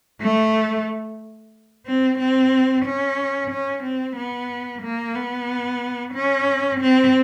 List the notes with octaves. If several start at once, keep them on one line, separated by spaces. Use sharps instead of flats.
A3
C4
C4
C#4
C#4
C4
B3
A#3
B3
C#4
C4